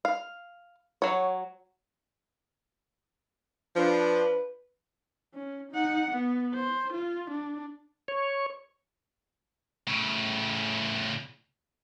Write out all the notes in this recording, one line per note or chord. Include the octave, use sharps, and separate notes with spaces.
F5
F#3 C#5
F3 D4 B4
C#4
D#4 F#5
B3
C5
F4
D4
C#5
A2 C#3